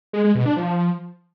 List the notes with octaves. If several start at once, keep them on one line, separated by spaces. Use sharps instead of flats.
G#3
G#3
B2
D4
F3